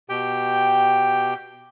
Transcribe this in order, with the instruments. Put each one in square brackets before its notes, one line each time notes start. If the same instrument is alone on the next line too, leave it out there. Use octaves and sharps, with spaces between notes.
[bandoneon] B2 G4 G5